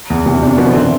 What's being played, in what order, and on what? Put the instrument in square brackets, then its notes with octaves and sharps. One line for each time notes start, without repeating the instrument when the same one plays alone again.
[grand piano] E2
[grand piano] E2 [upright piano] C3
[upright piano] B2
[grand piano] D4
[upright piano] C3
[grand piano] B2 [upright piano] F3
[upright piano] E3
[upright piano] D3 [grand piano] C4
[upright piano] E3